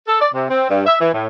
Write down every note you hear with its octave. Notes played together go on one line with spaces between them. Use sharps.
A4
D5
C3
C4
G2
E5
E3
A2